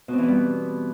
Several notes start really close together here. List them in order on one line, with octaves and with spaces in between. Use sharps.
B2 C4 E3 B3 G3